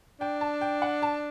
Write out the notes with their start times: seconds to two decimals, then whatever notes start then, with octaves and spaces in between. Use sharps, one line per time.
0.21 D4 G5
0.41 A5
0.61 G5
0.82 F#5
1.02 A5